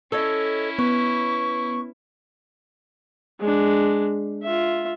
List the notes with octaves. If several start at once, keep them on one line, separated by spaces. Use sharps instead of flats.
C#4 E4 A4 C#5 D#5
B3 B4 C#6
G#3 D4
F4 E5